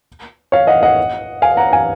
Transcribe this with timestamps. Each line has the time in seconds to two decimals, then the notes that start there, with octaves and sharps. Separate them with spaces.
0.52 C#5 F5
0.67 D#5 F#5
0.83 D#5 F#5
1.42 F5 G#5
1.57 F#5 A#5
1.73 F5 G#5